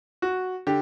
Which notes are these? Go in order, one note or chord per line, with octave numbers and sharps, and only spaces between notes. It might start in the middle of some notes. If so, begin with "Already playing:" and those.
F#4
D3 G4